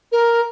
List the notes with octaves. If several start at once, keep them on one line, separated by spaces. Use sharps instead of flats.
A#4